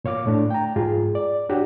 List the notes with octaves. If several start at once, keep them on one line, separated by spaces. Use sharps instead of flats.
A#2 C#5 F5 D6
A2 A3 D4
G5 A#5
G#2 F4 G#4
D5
D4 F#4 G4 C#5